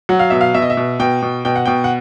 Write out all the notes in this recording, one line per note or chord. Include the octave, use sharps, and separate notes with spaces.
F#3 F#5
F5
B2 E5
F5
B2 E5
D#5
E5
B2
B2 G5
B2
B2 G5
F#5
B2 G5
F#5